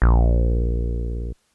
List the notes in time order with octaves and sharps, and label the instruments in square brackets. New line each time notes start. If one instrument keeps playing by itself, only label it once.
[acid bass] A#1